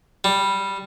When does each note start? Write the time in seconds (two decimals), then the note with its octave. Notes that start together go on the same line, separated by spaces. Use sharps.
0.24 G3